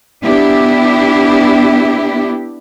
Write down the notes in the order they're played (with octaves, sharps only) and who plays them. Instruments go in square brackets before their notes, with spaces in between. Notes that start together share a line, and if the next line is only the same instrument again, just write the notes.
[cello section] B3 D4 E4 G4